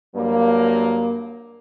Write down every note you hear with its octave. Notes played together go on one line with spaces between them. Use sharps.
G2 F#3 A#3